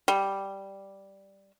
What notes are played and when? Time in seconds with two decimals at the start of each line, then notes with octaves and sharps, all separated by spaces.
0.08 G3